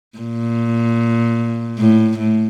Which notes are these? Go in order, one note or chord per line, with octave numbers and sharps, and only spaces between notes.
A#2
A2
A2